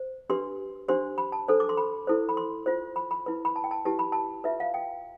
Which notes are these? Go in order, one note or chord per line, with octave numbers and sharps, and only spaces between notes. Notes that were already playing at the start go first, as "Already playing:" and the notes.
Already playing: C5
D4 G4 B4 C6
D4 G4 C5 C6
B5
A5
D4 A4 C5
D6
C6
B5
E4 A4 C5
B5
C6
F4 C5
B5
B5
E4 B4
B5
A5
G5
A5
E4 G4 B4 A5
B5
A5
F4 B4 E5
F5
G5